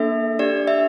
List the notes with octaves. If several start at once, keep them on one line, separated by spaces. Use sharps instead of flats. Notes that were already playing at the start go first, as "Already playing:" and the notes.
Already playing: A#3 D4 A4 E5
D4 G4 D5
E5